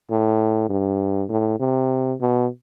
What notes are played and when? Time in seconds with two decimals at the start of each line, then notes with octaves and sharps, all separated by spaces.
0.10 A2
0.70 G2
1.30 A2
1.60 C3
2.21 B2